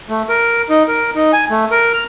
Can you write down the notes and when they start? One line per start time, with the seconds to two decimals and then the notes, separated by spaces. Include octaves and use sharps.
0.09 A3
0.29 A#4
0.70 D#4
0.88 A#4
1.15 D#4
1.33 G#5
1.50 A3
1.71 A#4
1.93 F6